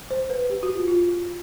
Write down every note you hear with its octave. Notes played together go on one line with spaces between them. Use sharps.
C5
B4
G4
F#4
F4
F4